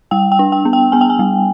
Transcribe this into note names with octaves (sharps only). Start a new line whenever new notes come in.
G3 G5
G5
D4
G5
B3
G5
B3 G#5
G5
G#5
G3